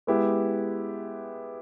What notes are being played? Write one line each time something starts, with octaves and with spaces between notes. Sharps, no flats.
G#3 B3 E4 G4